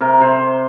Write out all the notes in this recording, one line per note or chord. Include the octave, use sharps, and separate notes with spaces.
C3 A#4
C3 C5